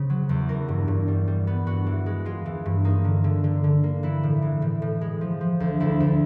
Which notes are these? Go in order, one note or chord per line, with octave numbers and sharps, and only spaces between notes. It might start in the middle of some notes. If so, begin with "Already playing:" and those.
Already playing: C#3 C5
F#3
E2
E3 A#4
G2
G2
G3
G3
B3
G2 F#4
E3
G#3
G#3 F4
E3
G2
A#3 D#4
D3
D3
D3
D3
A#3
E3 E4
A2
E3
A2
A2
G#3
F3
F3
D2
D2 E4
D2